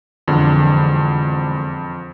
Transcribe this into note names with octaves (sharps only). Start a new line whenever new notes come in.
E1 F2 D3